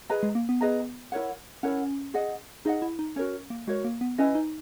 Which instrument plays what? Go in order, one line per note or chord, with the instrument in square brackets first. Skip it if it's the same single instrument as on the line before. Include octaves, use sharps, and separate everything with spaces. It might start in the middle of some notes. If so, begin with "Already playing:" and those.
[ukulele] G#4 B4 D#5 A#5
[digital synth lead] G#3
A#3
B3
[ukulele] G#4 B4 D#5 A#5
E4 A#4 C#5 F#5
[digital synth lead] C#4 [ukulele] E4 A#4 C#5 F#5
[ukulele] G#4 D#5 F#5
[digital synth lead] D#4 [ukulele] G#4 D#5 F#5
[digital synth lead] E4
D#4
[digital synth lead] C#4 [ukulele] F#4 A#4 C#5
[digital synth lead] A#3
[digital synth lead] G#3 [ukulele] F#4 A#4 C#5
[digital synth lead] A#3
B3
[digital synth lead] C#4 [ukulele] E4 B4 D#5 G#5
[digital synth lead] D#4